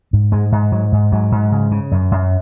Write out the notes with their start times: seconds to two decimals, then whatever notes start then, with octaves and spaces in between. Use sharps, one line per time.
0.13 G#2
0.32 G#2 G#3
0.52 G#2
0.72 G#2 F#3
0.92 G#2
1.12 G#2 F#3
1.32 G#2
1.52 C#3
1.71 C#3
1.91 F#2
2.12 F#2